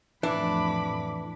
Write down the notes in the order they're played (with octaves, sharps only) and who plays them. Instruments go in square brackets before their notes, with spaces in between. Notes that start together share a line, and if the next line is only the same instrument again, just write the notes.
[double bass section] F2 A2 [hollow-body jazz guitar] E3 [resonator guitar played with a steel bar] D4 [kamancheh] B5 D6